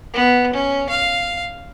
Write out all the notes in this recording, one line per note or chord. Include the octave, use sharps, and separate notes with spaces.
B3
C#4
F5